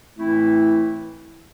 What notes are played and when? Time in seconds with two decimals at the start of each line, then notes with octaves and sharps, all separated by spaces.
0.18 A2 E3 A3 C4 E4